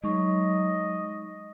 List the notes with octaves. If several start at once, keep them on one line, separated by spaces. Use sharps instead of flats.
F#3 G#3 D#4 D#5 C#6